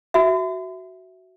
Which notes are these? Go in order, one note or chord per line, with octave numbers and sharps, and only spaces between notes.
F#4 E5